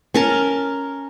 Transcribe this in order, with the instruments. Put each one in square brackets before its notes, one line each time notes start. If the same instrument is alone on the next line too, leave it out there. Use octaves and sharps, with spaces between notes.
[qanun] C#4 A#4 A5